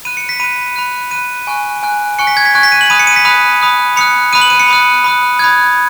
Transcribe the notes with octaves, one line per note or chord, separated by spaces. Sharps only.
B5 F#6 D#7
C#7
B6
B5 F#6 D#7
B5 F#6
B5 F#6 D#7
G#5 C#6 F#6
G#5 C#6 F#6
G#5 C#6 F#6 C#7
B6
G#6
B6
G#5 C#6 F#6 G#6
B6
D#7
F#7
B5 D#6 F#6 D#7
C#7
D#7
B6
B5 D#6 F#6
B5 D#6 F#6
B5 D#6 F#6 C#7
B5 D#6 F#6 D#7
F#7
D#7
C#7
B5 D#6 F#6
B5 D#6 F#6
B5 D#6 F#6 G#6